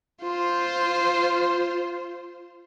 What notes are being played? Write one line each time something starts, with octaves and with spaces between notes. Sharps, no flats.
F4 C5